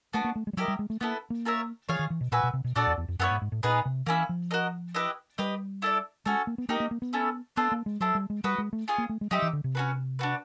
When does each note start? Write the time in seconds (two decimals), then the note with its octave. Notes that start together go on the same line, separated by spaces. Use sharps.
0.13 A3 B3 D4 F#4
0.24 A#3
0.36 A3
0.47 G#3
0.53 G3
0.57 F#3 E4 G4 A#4 D#5
0.68 G3
0.79 G#3
0.90 A3
1.01 A#3 B3 E4 A4
1.30 A#3
1.45 F4 A#4 C#5 E5
1.89 E3 F4 G#4 C#5 F5
1.99 D#3
2.10 E3
2.21 B2
2.32 A#2 F#4 B4 E5 G#5
2.43 B2
2.53 C3
2.64 B2
2.76 A#2 D4 F#4 A4 D5
2.87 E2
2.98 E2
3.08 F2
3.19 F#2 B3 E4 A4 C#5
3.31 G#2
3.42 G#2
3.52 A2
3.63 A#2 B3 D#4 G#4 B4
3.86 C3
4.06 E3 A#3 C#4 E4
4.29 F3
4.51 F#4 A#4 D#5
4.95 E4 G4 B4 D#5
5.38 G3 G4 B4 D#5
5.82 E4 A4 D5
6.26 G#3 C#4 F#4 A4
6.47 A#3
6.58 B3
6.69 A#3 D#4 G4 A#4 D#5
6.80 A#3
6.91 A#3
7.02 B3
7.13 A3 C#4 E4 A4
7.56 B3 D4 F4 A4 C5
7.72 A#3
7.86 G#3
8.00 F#3 E4 A4 C5
8.15 G3
8.30 G#3
8.44 G3 F#4 B4 D#5
8.58 G#3
8.73 A3
8.88 C#4 F4 G#4
8.98 A#3
9.09 A3
9.21 G#3
9.31 F#3 D#4 G4 C5 E5
9.42 E3
9.53 D3
9.64 C3
9.75 C#4 F#4 B4
10.19 D4 F#4 B4